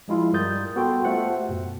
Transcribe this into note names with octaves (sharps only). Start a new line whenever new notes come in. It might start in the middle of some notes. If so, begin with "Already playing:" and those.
F3 G#3 E4 F4
G2 G3 A#4 D#6 G6 A6
B3 F#4 A4 G5 C6
A3 F4 C5 F#5
G4
F#2 B2